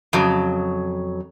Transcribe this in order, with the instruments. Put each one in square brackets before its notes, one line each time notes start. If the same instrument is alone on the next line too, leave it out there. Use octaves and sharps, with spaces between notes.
[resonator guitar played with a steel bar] F2 C#3 F#3